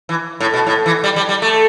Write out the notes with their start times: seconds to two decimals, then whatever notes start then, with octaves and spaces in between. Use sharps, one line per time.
0.09 E3
0.40 A2
0.54 B2
0.67 A2
0.86 E3
1.04 G3
1.16 G3
1.29 G3
1.42 A3